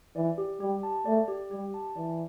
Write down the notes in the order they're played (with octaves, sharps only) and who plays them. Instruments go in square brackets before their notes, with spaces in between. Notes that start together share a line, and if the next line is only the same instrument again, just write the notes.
[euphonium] E3 [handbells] D5
[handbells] G4
[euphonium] G3 [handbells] G4
[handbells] A5
[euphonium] A3 [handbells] D5
[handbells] G4
[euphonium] G3 [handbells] G4
[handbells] A5
[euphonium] E3 [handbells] D5